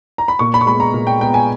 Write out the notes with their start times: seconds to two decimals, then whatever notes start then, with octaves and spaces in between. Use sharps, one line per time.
0.18 A#5
0.28 B5
0.39 A#2 C#6
0.54 B5
0.61 C#6
0.66 G#3 B3 B5
0.80 A#5
0.94 A#2
1.07 G5
1.20 G#3 B3 G5
1.34 G#5